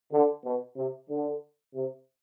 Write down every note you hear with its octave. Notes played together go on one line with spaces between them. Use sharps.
D3
B2
C3
D3
C3